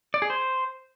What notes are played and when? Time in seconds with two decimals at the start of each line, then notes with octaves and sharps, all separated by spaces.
0.14 D5
0.22 G#4
0.30 C5